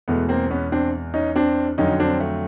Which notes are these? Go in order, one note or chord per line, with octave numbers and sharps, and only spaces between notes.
E2 B2 G#3 A3 B3
A#3 C4
B3 C#4
C4 D4
C#4 D#4
C4 D4
F2 D3 F#3 C#4 D#4
C4 D4
A3